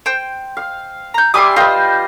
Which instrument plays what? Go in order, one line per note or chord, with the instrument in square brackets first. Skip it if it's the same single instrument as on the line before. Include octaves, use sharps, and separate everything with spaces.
[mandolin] C5 G5
[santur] F5
[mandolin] A#5 G6
[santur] G3 E5 C6 [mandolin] G#5 D6 D#6
[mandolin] F4 B4 [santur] C5 D#5 G5